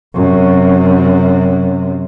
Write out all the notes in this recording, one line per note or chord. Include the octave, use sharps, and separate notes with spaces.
F#2 C3